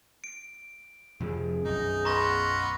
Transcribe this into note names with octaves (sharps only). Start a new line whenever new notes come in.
D7
F2 C3 F3 G#4
B1 F#2 D#4
B3 F4 D#5 A#5 C#6 A#6